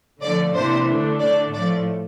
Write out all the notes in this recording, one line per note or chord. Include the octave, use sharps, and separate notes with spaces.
D3 F3 A3 D5
C3 E3 A#3 D4 C5
D3 A3 D4
D3 A3 D4 D5
A2 F3 A3 D5